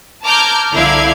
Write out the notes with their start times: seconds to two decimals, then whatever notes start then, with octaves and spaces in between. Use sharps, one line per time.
0.24 A5 A#5 D6 F6 G6 G#6
0.73 C2 D3 E4 F5 D6 G#6